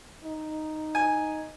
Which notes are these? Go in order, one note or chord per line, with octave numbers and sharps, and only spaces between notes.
D#4
G#5